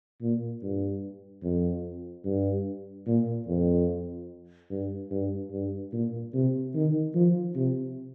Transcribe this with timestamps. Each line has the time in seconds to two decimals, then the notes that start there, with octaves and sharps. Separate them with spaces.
0.22 A#2
0.62 G2
1.44 F2
2.25 G2
3.07 A#2
3.48 F2
4.70 G2
5.11 G2
5.51 G2
5.93 A#2
6.34 C3
6.74 D#3
7.15 F3
7.56 C3